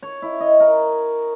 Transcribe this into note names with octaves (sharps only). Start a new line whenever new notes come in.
C#5
E4
D#5
A#4